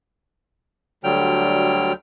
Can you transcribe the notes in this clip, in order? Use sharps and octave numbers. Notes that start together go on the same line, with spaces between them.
D2 D3 F#3 G3 G5 F6